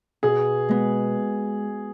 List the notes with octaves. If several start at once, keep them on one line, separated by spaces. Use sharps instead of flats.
B2 G#4
G#3 B3